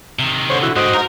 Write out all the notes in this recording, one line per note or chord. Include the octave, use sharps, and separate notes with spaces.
C3 D#3
D3 C5 C#5
E4 F#4
G#2 F#4 G4 C5 D#5
G#2 D#4 A#4 A#5